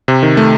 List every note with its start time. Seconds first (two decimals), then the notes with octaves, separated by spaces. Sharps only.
0.08 C3
0.23 D#3
0.37 A3